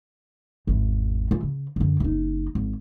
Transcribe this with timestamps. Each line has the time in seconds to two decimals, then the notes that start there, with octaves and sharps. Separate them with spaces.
0.67 G#1 E2
1.31 E3 F4
1.43 C#3
1.76 F#2 D3
2.00 F#1 D#4
2.55 G#1